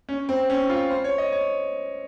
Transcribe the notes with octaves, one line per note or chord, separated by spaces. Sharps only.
C#4
C4
C#4
F4
C5
C#5
D#5
C#5